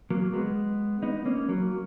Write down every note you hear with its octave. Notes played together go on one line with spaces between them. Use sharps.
F#3 A#3
G#3 B3
B3 D#4
A#3 C#4
F#3 A#3